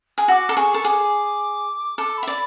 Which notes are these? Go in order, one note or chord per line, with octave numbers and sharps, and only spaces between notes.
G#4
F#4 D6 E6
A4
G#4 C#6
A4
G#4 D6
A4 D6
B5
E5
D5